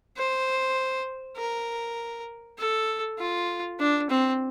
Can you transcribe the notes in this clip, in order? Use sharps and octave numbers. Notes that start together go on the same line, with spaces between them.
C5
A#4
A4
F4
D4
C4